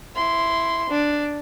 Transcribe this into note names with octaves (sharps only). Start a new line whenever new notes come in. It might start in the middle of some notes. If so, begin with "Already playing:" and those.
E4 C6
D4